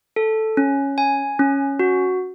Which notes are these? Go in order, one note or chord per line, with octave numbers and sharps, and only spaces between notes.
A4
C#4
G#5
C#4
F#4